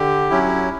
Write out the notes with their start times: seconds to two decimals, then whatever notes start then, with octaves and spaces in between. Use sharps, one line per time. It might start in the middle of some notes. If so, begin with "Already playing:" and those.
Already playing: D3 G4
0.30 F#3 C#4 E4